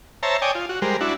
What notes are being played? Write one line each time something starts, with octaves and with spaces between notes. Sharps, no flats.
C5 C#5 E5 A5 A#5
C#5 D5 G5 G#5 D#6
F4
F#4
G3 G#3 A#4 C5
D4 E4 F#4